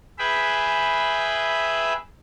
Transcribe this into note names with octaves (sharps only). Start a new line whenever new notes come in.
G#4 B4 E5 G5 B5